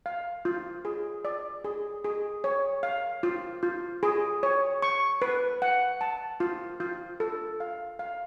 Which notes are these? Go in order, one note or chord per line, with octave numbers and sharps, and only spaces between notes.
F5
F4
G#4
D5
G#4
G#4
C#5
F5
F4
F4
G#4
C#5
C#6
B4
F#5
A5
F4
F4
A4
F5
F5